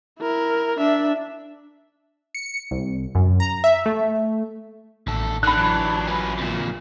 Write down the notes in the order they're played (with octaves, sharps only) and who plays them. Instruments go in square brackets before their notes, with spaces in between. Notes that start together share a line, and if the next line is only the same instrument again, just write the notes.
[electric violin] E4 A#4
D4 E5
[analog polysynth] C#7
C2
F#2
A#5
E5
A3
[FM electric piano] A1 [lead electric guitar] D#2 A4
[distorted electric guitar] D3 D#3 [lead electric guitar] D4 [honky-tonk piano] B5 F#6
[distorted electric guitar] E3 F#3
[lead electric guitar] C#4 B4
F2 A#2